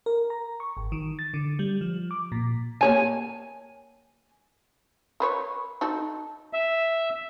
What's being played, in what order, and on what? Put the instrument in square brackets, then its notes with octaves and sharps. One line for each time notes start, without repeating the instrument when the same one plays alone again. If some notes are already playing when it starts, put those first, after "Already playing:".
[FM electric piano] A#4
A#5
C#6
G#1
D#3
A6
D3
G3
F3
D6
A#2
[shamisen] A#3 C#5 A5 [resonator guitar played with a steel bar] G#5
[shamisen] A#4 B4 C#5
D#4 F#4 A4
[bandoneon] E5